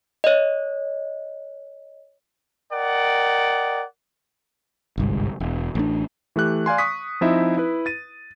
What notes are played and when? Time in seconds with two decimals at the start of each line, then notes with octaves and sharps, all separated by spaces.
0.24 C#5 D#5
2.72 A#4 D5 D#5 F#5 G5
4.98 G1 C2 G#2
5.40 E1
5.75 A1 D4
6.36 E3 A3 G4 F#6
6.66 D5 F5 G#5 C6
6.78 C#6 D#6 B6
7.21 F3 C4 D#4 E4 D#5 E5
7.57 E4 B4
7.86 A6 D#7